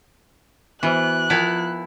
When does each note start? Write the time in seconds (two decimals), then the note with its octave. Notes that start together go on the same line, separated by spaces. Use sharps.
0.83 E3 B3 F#4 C5 F#6
1.30 F3 B3 E4 F4 F5 A5